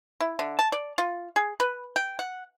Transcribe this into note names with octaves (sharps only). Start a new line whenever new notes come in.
E4
D3
A5
D5
F4
G#4
B4
G5
F#5